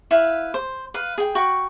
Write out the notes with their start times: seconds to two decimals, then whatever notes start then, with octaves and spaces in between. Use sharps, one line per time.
0.11 E4 B4 F5
0.54 C5
0.94 B4 F5
1.18 G#4 G5
1.35 F#4 G5 B5 C#6